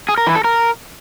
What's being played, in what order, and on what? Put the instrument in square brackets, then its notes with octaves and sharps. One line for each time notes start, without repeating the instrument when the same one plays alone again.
[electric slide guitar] G#4
A#4
E3
A4
A#4